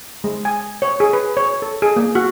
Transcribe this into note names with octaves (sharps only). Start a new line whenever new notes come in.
G#3
G#5
C#5
G#4
B4
C#5
A4
G#4
A#3
F#4